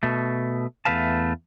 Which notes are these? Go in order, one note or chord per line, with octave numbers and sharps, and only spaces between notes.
B2 A3
E2 G2 A3 B4 F5 A5